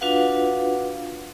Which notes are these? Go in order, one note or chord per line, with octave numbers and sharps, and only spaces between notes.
D4 F4 F#4 B4 F5 F#5